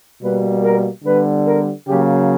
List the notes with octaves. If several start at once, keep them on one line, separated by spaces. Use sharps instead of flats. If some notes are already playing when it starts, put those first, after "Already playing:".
B2 G3 A#3 B4
A#4
D3 G3 B3 B4
A#4
C#3 F#3 A#3 G4